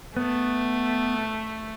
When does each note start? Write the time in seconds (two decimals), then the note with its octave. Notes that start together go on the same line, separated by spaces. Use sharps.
0.17 A3 B3